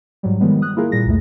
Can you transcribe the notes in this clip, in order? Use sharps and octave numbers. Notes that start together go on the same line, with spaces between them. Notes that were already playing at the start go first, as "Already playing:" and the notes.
G#2 F#3 G3
D#3 F3 G3 G#3 B3
D#6 F#6
A#3 E4 F4 G#4 A#4
A#2 G3 A#6
C2 F2 A3